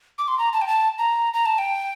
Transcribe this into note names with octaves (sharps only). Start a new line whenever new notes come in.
D6
C6
A#5
A5
G5
A5
A#5
A#5
A5
G5